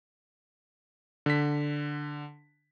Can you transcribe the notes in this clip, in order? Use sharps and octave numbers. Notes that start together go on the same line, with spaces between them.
D3 B6